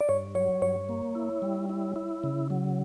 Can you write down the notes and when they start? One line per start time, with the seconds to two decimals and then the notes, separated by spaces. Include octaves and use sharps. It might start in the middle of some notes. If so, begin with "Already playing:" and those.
0.01 D5
0.08 G2 C#5
0.35 F#3 C#5
0.62 G2 C#5
0.89 A#3
1.15 E4
1.42 G3
1.69 E4
1.96 E4
2.24 C#3
2.50 F#3